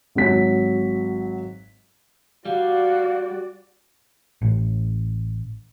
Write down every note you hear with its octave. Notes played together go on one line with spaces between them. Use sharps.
G#1 F#3 B6
G3 F#4 D5 F5
A1